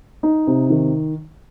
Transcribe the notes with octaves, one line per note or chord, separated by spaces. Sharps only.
D#4
C3
D#3